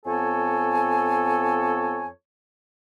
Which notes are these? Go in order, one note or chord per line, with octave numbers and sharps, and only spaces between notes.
F2 B3 A4 C#5 G#5